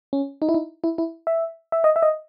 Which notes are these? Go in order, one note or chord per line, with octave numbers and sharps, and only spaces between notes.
C#4
D#4
E4
D#4
E4
E4
E5
E5
D#5
E5
D#5